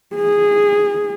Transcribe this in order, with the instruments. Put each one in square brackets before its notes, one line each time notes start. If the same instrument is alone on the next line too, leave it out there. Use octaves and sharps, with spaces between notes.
[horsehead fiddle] G#4